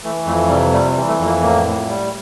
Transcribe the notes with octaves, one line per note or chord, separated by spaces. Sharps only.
E3 A3
F2 A3
C3 G3
G3 A3
G3
E3
A3
F2
A#3
A2 A#3
A2
G3